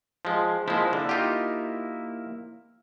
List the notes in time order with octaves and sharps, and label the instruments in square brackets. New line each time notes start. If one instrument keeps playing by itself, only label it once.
[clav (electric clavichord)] F3 G#3
[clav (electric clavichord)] F3 G#3 [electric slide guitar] A#3 E4
[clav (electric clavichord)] D3
D#4 F4 G4